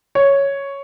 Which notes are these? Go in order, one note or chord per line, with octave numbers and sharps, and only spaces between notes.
C#5